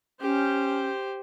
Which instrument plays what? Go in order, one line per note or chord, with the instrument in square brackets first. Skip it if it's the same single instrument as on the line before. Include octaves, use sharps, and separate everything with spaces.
[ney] C#4 [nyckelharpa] G4 C5